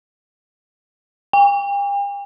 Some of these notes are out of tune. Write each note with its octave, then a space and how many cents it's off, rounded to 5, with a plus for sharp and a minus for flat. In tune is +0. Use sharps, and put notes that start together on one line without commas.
G5 +45